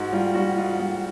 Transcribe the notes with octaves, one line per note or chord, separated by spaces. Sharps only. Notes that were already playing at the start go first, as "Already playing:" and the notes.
Already playing: G#2 F#4
G3 F4
G3 F#4
G#2 F4
G3